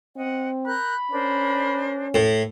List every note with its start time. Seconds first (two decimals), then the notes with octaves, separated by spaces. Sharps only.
0.16 C4 D#5 F#5
0.67 A#4 B5 F#6 G6
1.11 C#4 D4 A#4 C5
2.14 A2